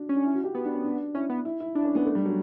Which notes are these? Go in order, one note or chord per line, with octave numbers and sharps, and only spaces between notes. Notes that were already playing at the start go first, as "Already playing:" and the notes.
Already playing: D4 F#4
C#4
D4
E4
F#4
G4
B3 F#4
D4
C#4
D4
C#4 E4
B3
E4
E4
D4 E4
C#4
B3
A3
G3
F#3